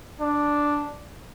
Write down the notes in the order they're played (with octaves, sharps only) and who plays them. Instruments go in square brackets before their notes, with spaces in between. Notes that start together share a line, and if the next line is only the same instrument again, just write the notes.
[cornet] D4